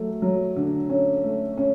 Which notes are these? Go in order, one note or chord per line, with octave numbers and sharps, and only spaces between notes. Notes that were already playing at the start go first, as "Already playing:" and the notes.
Already playing: F#3 A3
F#3
D3
C#4
A3
C#4